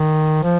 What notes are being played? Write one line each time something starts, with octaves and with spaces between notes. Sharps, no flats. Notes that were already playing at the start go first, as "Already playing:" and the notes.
Already playing: D#3
F3